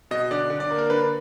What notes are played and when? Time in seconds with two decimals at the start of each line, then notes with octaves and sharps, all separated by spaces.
0.11 B2 D#5
0.31 D3 D5
0.50 D3
0.60 D5
0.71 A#3
0.78 A#4
0.90 D3 B4